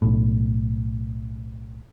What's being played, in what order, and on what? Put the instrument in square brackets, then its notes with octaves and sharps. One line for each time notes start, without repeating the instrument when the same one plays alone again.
[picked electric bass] B1 A2